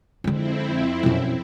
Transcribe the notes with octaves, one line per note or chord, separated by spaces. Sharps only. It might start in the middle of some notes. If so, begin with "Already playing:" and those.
F2 D3 G#3 C4 E4
F#2 B2